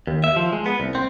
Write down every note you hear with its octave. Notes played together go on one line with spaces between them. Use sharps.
D#2
E5
F3
G#3
B3
C2
C4